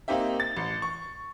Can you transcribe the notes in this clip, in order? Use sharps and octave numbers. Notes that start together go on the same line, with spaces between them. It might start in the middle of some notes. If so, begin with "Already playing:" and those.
A#3 C4 D#4 G4 E5
A6
A1
C#6